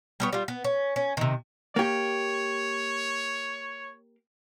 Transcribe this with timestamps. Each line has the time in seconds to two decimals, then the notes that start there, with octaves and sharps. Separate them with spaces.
0.20 G3 B3 C#5
0.33 G3 F4
0.48 B3
0.64 C#4
0.96 C#4
1.17 C3 D#3
1.76 A#3 G4 C#5